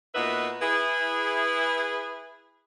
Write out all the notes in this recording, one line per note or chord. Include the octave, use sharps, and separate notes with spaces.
A#2 B3 D#4 F#4 B4 E5
E4 G#4 B4